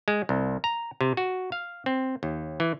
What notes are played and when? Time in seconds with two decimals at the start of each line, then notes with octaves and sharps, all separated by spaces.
0.08 G#3
0.29 C2
0.64 A#5
1.01 C3
1.17 F#4
1.52 F5
1.86 C4
2.23 D#2
2.60 E3